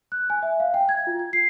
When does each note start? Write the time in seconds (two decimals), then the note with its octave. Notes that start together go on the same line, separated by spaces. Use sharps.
0.12 F#6
0.30 G#5
0.43 E5
0.60 F5
0.74 G5
0.89 G#6
1.07 F4
1.19 G#6
1.33 C7